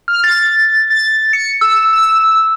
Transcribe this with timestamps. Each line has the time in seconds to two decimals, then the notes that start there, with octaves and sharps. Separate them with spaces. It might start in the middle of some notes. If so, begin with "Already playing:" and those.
0.08 F6
0.24 A6
0.90 A6
1.33 C#7
1.61 E6
1.93 E6